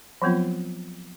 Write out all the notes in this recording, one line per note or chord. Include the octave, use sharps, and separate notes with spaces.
F3 F#3 B3 C4 F4